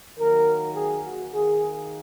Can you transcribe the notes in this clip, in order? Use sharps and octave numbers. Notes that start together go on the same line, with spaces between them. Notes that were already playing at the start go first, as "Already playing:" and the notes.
D#3 F#3 A#3 A#4
G#4
F#4
D#3 A#3 G#4